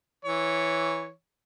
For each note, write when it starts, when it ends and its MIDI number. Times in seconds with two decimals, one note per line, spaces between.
0.25 1.10 52
0.25 1.10 73